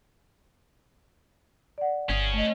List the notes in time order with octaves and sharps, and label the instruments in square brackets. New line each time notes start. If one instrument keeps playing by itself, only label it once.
[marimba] D5 F#5
[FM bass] G1 [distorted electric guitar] C#4 G#4
[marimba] A3 D#5